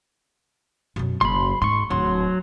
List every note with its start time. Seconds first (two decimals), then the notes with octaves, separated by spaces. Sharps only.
0.96 F#2 B2
1.21 F#1 B5 C6
1.62 G#2 C6 C#6
1.90 D1 F#3 C6